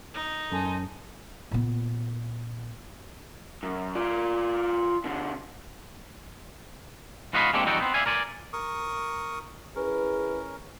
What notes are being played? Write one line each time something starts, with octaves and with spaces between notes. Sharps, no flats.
D#4
F#2 A4 G#5 C6
A#2 B3
F#2
F4 D5
B2 D3
G#2 F4 F#4 D#5 F5 B5
G#3 A#3 C4 D4 G4 A4
F2 G3 D#4 F#4 A4 G5
B3 C4
D5 E5 F5 G#5
A#4 D5 G#5
A#4 C#6 D#6
C#4 E4 G#4 A#4 B4